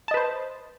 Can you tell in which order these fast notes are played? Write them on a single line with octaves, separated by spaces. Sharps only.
A5 D#5 B4 C5